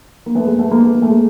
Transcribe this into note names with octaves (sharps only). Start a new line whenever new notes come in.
A#3
A3 B3
G#3 A#3
A3 B3
G#3 A#3
A3 B3
A#3
A3
G#3 A#3